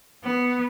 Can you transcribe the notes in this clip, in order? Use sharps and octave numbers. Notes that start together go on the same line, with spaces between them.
B3